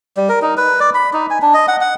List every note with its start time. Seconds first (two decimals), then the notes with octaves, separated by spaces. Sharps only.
0.17 G3
0.29 A#4
0.42 D#4
0.57 B4
0.80 D5
0.94 B5
1.13 D#4
1.30 G#5
1.42 D4
1.54 D#5
1.68 F#5
1.81 F#5